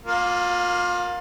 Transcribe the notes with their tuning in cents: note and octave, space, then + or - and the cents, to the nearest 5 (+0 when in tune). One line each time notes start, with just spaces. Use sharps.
A#3 +0 F4 +30